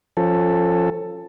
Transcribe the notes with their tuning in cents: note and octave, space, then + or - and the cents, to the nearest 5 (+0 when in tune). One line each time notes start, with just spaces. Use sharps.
F3 +0 C#4 -15 A4 +10